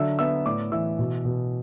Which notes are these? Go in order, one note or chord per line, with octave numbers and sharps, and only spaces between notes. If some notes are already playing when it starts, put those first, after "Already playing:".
Already playing: D3 F#3 E5 E6
B3 E5 E6
A2 D5 D6
E3 E5 E6
B2
B2